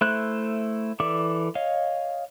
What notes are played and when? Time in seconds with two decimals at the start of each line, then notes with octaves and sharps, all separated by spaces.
0.01 A3 E4 C5 F#6
1.00 E3 A4 D5 E5 D6
1.55 C#5 D#5 F5